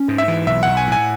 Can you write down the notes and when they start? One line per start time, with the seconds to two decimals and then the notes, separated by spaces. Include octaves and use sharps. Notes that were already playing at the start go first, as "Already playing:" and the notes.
Already playing: C#4
0.08 G#2
0.18 E5
0.28 E3
0.47 B1 E5
0.63 F#5
0.67 B1
0.77 G#5
0.87 A2 G#5